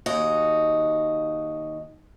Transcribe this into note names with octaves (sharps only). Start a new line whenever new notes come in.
D#2 D#4 F#4